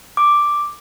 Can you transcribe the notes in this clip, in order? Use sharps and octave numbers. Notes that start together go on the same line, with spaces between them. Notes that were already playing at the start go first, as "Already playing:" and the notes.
D6